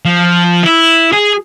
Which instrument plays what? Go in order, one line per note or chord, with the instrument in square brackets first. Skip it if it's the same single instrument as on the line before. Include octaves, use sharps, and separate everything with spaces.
[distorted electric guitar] F3
E4
G#4